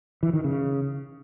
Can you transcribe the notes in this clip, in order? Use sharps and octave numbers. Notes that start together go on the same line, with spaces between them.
E3
D#3
C#3